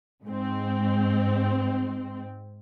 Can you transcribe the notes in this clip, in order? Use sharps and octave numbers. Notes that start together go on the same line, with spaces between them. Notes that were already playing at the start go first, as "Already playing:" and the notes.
G#2 C4